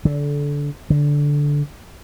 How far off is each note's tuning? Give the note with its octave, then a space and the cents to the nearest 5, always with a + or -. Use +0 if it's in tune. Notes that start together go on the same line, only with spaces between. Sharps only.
D3 -20
D3 -10